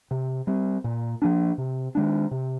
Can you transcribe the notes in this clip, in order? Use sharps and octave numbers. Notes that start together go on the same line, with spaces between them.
C3
G3 C4
A#2
F3 A#3 D4
C3
D#3 G#3 D4
C3